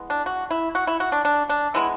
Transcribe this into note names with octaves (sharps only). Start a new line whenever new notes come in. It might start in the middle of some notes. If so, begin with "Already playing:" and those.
Already playing: E3 G#3 B3
D4
F#4
E4
F#4
E4
F#4
D4
D4
D4
E3 G#3 B3 E4